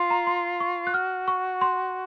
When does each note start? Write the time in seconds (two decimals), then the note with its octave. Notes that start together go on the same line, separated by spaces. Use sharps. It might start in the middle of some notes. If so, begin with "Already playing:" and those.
Already playing: F4 C6
0.10 A#5
0.27 C6
0.60 C#6
0.87 F#6
0.94 F#4 F6
1.28 C#6
1.61 C6